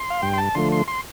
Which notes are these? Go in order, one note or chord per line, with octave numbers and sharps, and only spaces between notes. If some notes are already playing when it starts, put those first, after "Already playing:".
Already playing: C6
F5
G2 G5
C6
A5
D3 F3 A3 C6
C6
C6